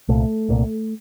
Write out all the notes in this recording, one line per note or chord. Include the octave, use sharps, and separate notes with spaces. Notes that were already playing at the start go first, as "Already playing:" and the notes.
C2 A#2 A3
C2 A#2